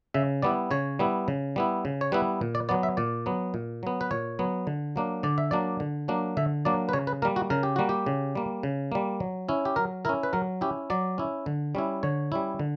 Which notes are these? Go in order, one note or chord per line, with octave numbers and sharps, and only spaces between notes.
C#3 E5
G3 B3 E4 D5
C#3 C#5
G3 B3 E4
C#3
G3 B3 E4
C#3
C#5
G3 B3 E4 B4
A#2
D5
F#3 B3 D5
E5
A#2 D5
F#3 B3
A#2
F#3 B3
B4
A#2 C#5
F#3 B3
D3
F#3 A#3 D4
D3 D5
E5
F#3 A#3 D4 D5
D3
F#3 A#3 D4
D3 E5
F#3 A#3 D4 D5
B4
C#3 C#5
B4
G3 A#3 A#4
F#4
C#3 A#4
G4
G3 A#3 F#4
G4
C#3
G3 A#3
C#3
G3 A#3
F#3
C#4 E4
G4
F#3 A#4
C#4 E4 A#4
B4
F#3 A#4
C#4 E4 G4
F#3 D5
C#4 E4
D3
G3 C#4 E4
D3 C#5
G3 C#4 E4
D3